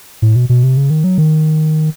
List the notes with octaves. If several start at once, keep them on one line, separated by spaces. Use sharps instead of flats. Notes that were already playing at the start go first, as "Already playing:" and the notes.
A2
B2
B2
C3
C#3
D#3
F#3
D#3